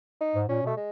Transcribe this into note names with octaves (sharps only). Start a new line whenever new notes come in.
D#4
G#2
A#2 C#4
B2 A3
G#3